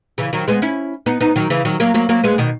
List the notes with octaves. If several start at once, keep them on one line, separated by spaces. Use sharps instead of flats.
C#3 E3
D#3 F#3
G#3 B3
C#4 E4
B3 D#4
B3 D#4
D#3 F#3
C#3 E3
D#3 F#3
F#3 A#3
F#3 A#3
F#3 A#3
G#3 B3
B2 D#3